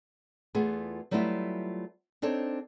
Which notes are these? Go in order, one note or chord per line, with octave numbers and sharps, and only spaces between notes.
E2 A3 B3 F4 G#4
F#3 G3 A3 B3 E4 F4
C4 D4 D#4 A4 C5 C#5